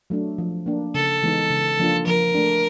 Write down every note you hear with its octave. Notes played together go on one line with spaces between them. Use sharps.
F#3 A3 D4
F3
A#3 D4
C#3 A4
E3 G#3 B3 D#4
C#3
F3 A#3 D4 F4
F3 A#4
A3 D4